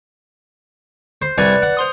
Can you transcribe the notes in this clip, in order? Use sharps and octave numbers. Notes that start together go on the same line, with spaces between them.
C5
C2 B4 D5 G#5
F#5
C5 C6 D#6